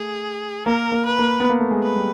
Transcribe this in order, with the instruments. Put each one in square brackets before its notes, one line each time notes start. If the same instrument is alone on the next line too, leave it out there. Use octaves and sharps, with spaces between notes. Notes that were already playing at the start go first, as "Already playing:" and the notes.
Already playing: [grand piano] A3 [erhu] G#4
[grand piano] A#3 [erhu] A#4
[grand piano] A#3
[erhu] B4
[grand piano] A#3
B3
A#3
A3
G#3
[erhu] B4
[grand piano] G3